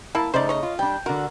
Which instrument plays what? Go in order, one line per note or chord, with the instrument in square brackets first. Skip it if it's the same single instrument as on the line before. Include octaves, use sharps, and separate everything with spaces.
[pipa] A#3 E4 [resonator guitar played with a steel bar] A5
[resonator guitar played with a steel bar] C#3 A3 D#4 [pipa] C5 D5
[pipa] C#5 D#5
[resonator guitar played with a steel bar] F4
[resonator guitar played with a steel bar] G3 D4 [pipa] G5
[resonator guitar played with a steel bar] D3 F#4 [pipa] A#4